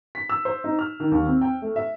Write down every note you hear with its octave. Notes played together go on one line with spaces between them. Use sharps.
B6
E6
C5
D#4
F6
D#3
D#2
C4
G5
A3
E5